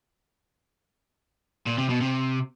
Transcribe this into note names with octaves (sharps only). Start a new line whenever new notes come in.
A#2
C3
B2
C3